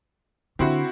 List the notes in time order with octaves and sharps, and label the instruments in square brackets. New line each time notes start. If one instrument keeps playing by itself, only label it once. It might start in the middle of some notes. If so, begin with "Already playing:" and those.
[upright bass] D3 [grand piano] C4 E4 F#4